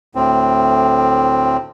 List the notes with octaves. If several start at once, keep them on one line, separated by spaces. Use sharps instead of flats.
D2 A2 C4